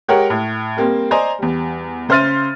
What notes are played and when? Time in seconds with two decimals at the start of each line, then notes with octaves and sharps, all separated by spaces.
0.08 G#3 G4 A#4 C#5 F#5
0.30 A2
0.77 G3 A#3 C4
1.11 C5 D5 D#5 G#5 A#5 C6
1.39 E2 G3
2.09 C#3 C5 E5 F6 A6 D#7